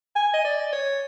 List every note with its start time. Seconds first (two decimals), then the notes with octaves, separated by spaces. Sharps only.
0.16 G#5
0.34 D#5
0.45 D5
0.73 C#5